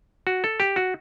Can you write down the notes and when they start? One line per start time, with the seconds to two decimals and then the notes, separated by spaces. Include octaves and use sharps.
0.27 F#4
0.44 A4
0.60 G4
0.76 F#4